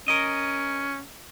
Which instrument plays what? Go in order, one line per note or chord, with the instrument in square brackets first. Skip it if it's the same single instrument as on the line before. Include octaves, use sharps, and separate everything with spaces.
[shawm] C#4 [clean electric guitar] A#4 D#5